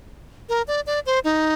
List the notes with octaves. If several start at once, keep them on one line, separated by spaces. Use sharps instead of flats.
A#4
D5
D5
C5
D#4